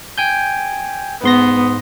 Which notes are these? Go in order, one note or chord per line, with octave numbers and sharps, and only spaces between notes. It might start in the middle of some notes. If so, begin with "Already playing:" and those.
G5 G#5 G6
G#2 B3 C6 A#6